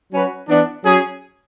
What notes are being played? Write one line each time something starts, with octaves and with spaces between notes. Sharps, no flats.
F#3 C#4 F#4 B4
E3 B3 D4
F#3 C#4 G#4